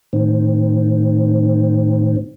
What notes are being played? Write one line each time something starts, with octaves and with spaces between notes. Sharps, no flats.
A2 D#3 C4